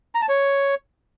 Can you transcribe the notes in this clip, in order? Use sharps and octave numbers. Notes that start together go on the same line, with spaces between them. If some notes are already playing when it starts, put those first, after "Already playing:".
A#5
A5
C#5